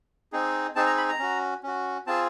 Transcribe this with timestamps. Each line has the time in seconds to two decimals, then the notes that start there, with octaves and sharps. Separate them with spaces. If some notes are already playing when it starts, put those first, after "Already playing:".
0.32 C4 D#4 G#4
0.75 C4 D#4 G#4 A5
0.87 A#5
0.97 B5
1.09 A#5
1.19 C#4 F#4
1.63 C#4 F#4
2.07 C4 F4 G#4 A5